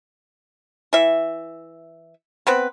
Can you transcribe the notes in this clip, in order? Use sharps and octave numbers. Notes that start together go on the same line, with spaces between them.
E3 E5
B3 C4 B4